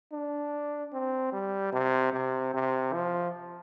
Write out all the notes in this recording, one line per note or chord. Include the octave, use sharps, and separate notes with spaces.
D4
C4
G3
C3
C3
C3
F3